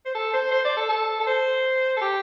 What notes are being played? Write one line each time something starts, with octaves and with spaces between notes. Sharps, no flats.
C5
A4
C5
C5
D5
A4
A4
A4
C5
A4
G4